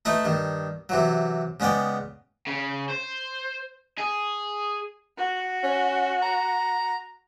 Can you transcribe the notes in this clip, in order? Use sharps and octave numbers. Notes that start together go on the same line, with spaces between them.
A3 D#4 E4 B4
G2 D#3
C3 E3 F#3
C#3 G#3 B3 D5 G5
C#3
C5
G#4
F#4
C#4
A#5